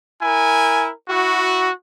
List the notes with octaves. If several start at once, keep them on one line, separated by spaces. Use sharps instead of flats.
E4 A#4 G#5
E4 F#4